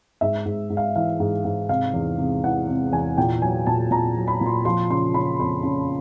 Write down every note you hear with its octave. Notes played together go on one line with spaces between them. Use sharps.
G#2 E5
G#2
G#2
F5
E3 F5
G#2
G#2
C3 F5
E2
C3
E3 F#5
C3
E2 G#5
A#2 G5
F#3 G#5
A#2 A5
A#2 A#5
F#3
B5
A#2
C6
F3 C6
C#3 C6
C#3 B5
F2 C6
C#3